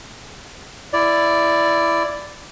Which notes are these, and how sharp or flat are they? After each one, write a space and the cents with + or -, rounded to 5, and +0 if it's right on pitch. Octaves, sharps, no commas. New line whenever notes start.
E4 +15 D5 +0